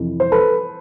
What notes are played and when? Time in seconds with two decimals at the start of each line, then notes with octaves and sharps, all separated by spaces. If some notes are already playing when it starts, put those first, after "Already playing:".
Already playing: F2 C3 E3
0.20 C5
0.32 A4 B4